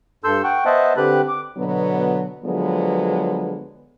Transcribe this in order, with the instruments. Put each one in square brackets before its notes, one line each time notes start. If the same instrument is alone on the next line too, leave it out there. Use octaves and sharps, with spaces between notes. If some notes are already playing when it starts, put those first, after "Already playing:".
[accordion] G2 A4 C6 E6 G6
F#5 G5 C#6
B3 C5 D#5 E5 F#5 A5
D3 C4 G4 B4 B5 F#6
D6
[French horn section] B2 D3 F#3 B3
D3 F3 F#3 G#3 B3